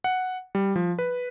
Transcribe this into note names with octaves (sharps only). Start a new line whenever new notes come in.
F#5
G3
F3
B4